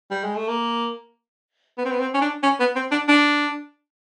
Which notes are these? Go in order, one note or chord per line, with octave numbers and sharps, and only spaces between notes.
G3
G#3
A3
A#3
B3
C4
B3
C4
C#4
D4
C#4
B3
C4
D4
D4